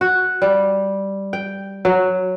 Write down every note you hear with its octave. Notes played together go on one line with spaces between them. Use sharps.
F#4
G3
G5
F#3